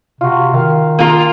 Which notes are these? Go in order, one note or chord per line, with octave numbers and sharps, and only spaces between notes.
C3 F4 F#4
D#3 F5
A#3 F4 G#4 A#4